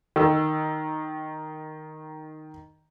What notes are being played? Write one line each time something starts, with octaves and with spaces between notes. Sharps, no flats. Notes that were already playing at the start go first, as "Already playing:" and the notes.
D#3 E6